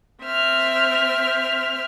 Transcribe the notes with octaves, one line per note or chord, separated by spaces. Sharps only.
C4 E5 F6